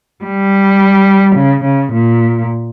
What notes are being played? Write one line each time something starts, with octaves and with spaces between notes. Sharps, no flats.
G3
C#3
C#3
A#2